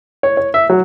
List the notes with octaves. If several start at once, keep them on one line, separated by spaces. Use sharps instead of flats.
C#5
C#5
E5
F#3